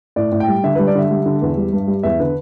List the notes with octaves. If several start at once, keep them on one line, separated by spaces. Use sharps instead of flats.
A2 D5
A2
G5
G3
D3 E5
G3 B4
D5
D3 E5
G3
D3
E2
G3
G2
G3
E2 E5
D3 B4